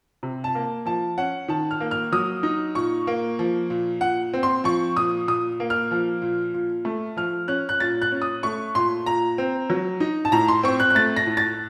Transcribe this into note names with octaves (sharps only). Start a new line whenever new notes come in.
C3
A5
A#3
F3 A5
C#4 F#5
D#3 A5
F6
A#3
F6
F#3 D#6
D#4
A#2 C#6
A#3
F3
A#2
A#2 F#5
C4
C6
F3 C#6
A#2 D#6
A#2 D#6
A#3
F6
F3
A#2
A#2
A3
F3 F6
C#4 F#6
F#6
A#2 A6
F#6
C#4
D#6
A3 C#6
A#2 C6
A#2 A#5
C4
F#3
D#4
A5
A2 A#5
C6
C4 C#6
F#6
F#6
A3 A6
A#6
A2
A6